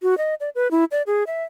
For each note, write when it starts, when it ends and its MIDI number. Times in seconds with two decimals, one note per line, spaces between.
0.02 0.17 66
0.18 0.34 75
0.40 0.49 74
0.55 0.70 71
0.71 0.84 64
0.92 1.02 74
1.07 1.24 68
1.27 1.43 76